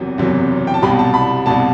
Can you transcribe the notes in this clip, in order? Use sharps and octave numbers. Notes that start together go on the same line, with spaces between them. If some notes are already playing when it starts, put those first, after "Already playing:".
Already playing: F#1 E2 C3 F#3
F#1 E2 C3 F#3
G5
A5
C2 B2 G3 B5
A5
B5
C2 B2 G3 A5